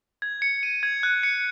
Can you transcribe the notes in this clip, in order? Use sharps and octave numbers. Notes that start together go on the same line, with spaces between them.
G#6
C#7
D#7
G#6
F#6
C#7